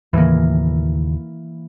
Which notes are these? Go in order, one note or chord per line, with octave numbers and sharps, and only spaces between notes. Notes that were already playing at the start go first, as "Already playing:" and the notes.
D#2 A2 C#3 E3 A#3